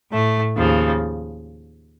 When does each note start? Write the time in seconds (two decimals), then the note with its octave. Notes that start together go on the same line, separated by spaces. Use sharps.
0.12 A2 A3
0.58 D#2 C#3 F3